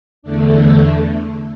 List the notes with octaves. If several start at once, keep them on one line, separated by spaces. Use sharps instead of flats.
E2 D3 A3 D4
E4